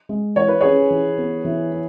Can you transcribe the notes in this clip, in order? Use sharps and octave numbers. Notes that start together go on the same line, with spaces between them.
G#3
E3 C#5
B4
C#4 G#4 C#5
E3
B3
E3
E4